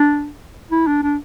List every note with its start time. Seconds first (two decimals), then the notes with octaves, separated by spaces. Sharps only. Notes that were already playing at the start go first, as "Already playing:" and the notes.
Already playing: D4
0.71 E4
0.87 D4
1.03 D4